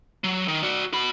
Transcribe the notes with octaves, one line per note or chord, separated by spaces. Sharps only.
F#3
D#3
F#4 D5
F#4 B5